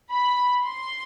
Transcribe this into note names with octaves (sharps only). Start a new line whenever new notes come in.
B5
C6